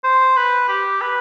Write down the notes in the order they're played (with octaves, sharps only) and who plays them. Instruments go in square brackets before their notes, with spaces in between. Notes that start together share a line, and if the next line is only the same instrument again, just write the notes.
[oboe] C5
B4
G4
B4